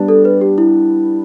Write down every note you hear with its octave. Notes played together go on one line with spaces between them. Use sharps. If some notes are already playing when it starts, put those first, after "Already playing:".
Already playing: G3 B3 D4
A4
B4
G4
E4